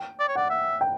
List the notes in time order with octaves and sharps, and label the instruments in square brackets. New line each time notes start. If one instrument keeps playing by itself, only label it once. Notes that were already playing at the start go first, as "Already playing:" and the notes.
Already playing: [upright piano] G5
[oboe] D5
C#5
[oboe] D5 [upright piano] F#5
[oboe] E5
[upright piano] G5